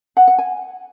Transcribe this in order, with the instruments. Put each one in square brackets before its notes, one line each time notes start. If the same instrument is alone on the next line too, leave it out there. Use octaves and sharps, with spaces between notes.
[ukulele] F#5
F#5
G#5